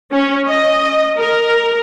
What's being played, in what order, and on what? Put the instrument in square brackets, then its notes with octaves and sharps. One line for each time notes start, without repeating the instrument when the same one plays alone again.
[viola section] C#4
D#5
A#4